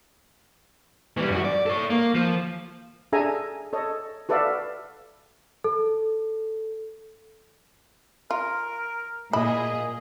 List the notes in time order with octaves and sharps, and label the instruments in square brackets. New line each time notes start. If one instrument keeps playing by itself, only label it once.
[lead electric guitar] E3 G3
F#2 F#4
D5
A4 C#5
A#3
F3
[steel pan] D4 G#4 A4 E5 G#5 A#5
A4 C#5 D#5
F#4 A4 B4 D5 E5 F5
[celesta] A4
[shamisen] F4 [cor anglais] A#4
[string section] A#2 G#4 [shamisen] E4 [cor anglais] D#5